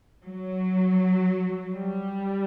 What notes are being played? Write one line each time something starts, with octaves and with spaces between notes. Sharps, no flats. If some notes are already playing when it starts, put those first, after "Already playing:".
F#3
G3